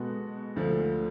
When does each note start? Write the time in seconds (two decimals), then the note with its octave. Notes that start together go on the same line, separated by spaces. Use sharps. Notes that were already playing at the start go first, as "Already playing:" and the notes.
Already playing: B2 G#3 B3 F#4 A4
0.56 D2 D3 F3